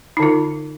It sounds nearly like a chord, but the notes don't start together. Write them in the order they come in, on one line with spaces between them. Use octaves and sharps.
D#4 D3 F4